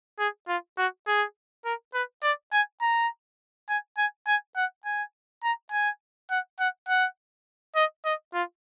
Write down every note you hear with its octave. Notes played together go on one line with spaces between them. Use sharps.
G#4
F4
F#4
G#4
A#4
B4
D5
G#5
A#5
G#5
G#5
G#5
F#5
G#5
A#5
G#5
F#5
F#5
F#5
D#5
D#5
F4